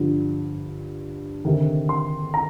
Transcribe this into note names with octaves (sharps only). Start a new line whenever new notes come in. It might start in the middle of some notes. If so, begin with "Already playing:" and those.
Already playing: G2 D3 F3
D2 C3 D#3
C6
A#5